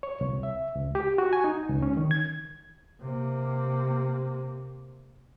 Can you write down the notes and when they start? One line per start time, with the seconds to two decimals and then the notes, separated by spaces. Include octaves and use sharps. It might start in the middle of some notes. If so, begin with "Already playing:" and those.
0.03 C#5
0.21 C2
0.43 E5
0.75 C#2
0.95 G4
1.18 F#4
1.33 G#5
1.44 D#4
1.69 C#2
1.83 C#4
1.97 D#3
2.11 G#6
3.01 C3 A#3